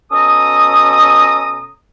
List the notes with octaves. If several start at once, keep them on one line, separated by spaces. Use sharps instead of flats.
B2 C#4 A4 A#5 D#6